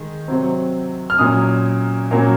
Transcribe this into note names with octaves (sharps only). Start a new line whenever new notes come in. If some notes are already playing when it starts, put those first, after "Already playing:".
Already playing: D#3 G#3
C3 F#3 C4
F6
A#2 F#3 C#4 D#6
A#2 F#3 A#3 C#4